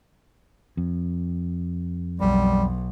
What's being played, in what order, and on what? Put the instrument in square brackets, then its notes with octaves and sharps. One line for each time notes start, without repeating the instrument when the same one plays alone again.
[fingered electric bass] F2
[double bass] B1 [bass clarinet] G3